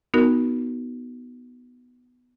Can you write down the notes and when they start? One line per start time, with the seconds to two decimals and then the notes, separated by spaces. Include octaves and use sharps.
0.14 B3 D#4 F#4 A#4